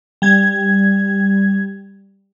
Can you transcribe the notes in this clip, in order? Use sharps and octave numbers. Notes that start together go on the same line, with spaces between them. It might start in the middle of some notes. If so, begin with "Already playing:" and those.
G3 G#6